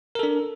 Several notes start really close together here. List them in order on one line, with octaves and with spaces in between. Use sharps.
A#4 A4 D4